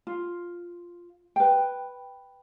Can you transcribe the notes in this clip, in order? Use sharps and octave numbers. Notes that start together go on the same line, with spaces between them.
F4
B4 G5